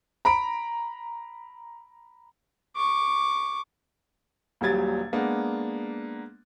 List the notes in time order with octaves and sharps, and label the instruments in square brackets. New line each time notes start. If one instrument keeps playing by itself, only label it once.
[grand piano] A#5 B5 D7
[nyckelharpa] C#6 D6
[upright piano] D#1 A#1 F#3 G3 G#6 A6
G#3 A#3 B3 D4